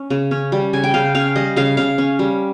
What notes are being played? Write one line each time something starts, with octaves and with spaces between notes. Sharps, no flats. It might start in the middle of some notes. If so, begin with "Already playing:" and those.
Already playing: C#4
C#3
C#4
G3
C#3 G#5
G5
C#3 F5
C#4 F5
G3 D#5
C#3 F5
C#3 F5
C#4
G3